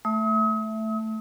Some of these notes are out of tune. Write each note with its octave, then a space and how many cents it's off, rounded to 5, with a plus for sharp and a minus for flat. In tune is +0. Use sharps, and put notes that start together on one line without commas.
A3 +0 E5 +0 D#6 +45